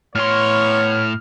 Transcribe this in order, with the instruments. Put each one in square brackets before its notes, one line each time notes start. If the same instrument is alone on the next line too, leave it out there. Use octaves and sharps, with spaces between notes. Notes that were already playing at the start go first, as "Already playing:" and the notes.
[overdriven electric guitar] A2 C6 [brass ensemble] B3 E4 C#5 [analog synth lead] F6